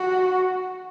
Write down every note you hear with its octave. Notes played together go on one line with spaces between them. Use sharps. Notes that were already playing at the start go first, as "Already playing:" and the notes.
Already playing: F#4